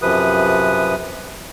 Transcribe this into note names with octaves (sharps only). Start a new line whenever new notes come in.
F#2 C3 F3 B4 D#6